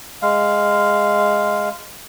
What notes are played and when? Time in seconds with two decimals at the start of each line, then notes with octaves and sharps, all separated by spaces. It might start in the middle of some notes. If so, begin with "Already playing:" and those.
0.22 G#3 F5